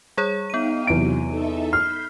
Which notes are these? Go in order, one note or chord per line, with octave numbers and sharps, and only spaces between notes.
G3 G#4 C#5
B3 D#4 F5 G5 D#7
E2 C3 F#3 D7
D#4 A4 E5
B5 F6 G6 C7